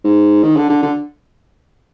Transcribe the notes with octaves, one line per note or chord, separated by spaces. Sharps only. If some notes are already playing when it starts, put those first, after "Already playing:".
G#2
D#3
D3
D3
D3